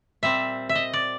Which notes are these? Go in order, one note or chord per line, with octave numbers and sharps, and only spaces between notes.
A#2 G3 C4 E5
E5
D#5
D5